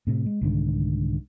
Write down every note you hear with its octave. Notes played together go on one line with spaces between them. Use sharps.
A2 C3
G#3
C2 G#2 D3 D#3